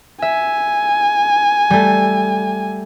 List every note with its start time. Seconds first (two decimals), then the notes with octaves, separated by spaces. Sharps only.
0.22 E5 G#5
1.70 G3 A3